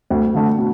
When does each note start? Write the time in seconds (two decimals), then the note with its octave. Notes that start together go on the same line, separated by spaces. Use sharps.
0.10 D2
0.35 D3 A3
0.58 B2